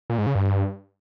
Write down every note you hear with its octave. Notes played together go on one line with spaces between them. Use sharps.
A#2
G#2
C#3
G2